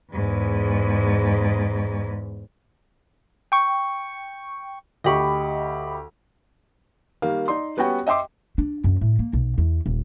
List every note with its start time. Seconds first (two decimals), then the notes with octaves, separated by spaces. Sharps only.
0.13 E2 G#2
3.52 G5 C#6
5.04 D2 G4 D#5 B5 C#6
7.22 D#3 G3 A#3 F5
7.48 D#4 D5 C6
7.77 G3 B3 C#4 F#4 G5
8.07 D#5 E5 G5 C6 D6
8.58 D4
8.84 F#2
9.01 A2
9.19 A#3
9.33 B1
9.58 E2
9.86 D#1